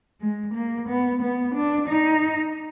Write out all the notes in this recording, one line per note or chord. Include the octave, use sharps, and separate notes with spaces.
G#3
A#3
B3
B3
D4
D#4